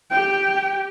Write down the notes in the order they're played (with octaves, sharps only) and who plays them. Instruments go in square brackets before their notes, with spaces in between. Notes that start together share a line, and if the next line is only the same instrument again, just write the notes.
[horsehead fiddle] G4 G5